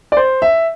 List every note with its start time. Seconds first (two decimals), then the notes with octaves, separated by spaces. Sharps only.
0.12 D5
0.17 C5
0.42 E5